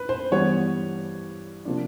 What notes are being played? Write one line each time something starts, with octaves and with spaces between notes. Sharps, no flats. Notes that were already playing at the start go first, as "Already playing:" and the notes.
Already playing: B4
C5
G2 E3 G3 B3 C#5
C3 F3 A#3 D4